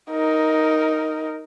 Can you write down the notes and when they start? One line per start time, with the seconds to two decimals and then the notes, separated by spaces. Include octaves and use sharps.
0.10 D#4 A#4